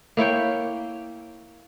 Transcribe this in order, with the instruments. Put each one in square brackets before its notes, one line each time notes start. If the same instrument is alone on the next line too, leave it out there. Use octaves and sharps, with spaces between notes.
[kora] A#3 E4 C#5 G5